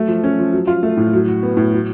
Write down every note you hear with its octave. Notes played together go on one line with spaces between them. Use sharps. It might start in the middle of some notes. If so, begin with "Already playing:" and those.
Already playing: F#3 A3
F3
C#4
F3
F#3
F4
A3
A2
F#3
F#4
B3
A2
F#3